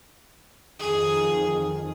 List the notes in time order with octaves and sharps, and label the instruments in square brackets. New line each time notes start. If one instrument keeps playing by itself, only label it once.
[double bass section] F2 D#3 [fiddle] G#4